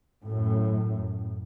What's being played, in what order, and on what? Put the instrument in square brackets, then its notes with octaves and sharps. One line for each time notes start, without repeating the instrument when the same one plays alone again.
[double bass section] F#2 A2